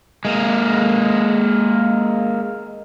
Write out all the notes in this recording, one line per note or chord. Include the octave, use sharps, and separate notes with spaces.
G#3 A#3